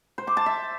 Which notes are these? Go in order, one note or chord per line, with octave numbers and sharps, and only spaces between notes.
C5
D6
A5
E5